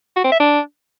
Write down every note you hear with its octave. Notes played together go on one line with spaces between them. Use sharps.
F#4
C4
E5
D4